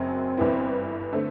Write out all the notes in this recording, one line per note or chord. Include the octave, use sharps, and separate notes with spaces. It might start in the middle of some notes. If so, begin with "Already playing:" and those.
Already playing: F#1 F#2 F#3 C4
G1 G2 E3 B3 E4
D3 A3 C4